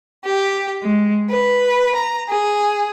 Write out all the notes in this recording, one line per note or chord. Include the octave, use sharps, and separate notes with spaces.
G4
G#3
B4
A#5
G#4